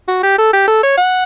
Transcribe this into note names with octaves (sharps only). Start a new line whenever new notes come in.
F#4
G4
A4
G4
A4
C#5
F#5